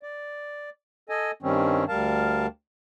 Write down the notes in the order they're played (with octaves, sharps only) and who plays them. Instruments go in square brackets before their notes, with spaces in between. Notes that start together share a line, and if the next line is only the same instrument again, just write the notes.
[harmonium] D5
A4 D#5 G#5
G2 D#3 G3 C4 C#4
D2 G3 A#4 F5 A5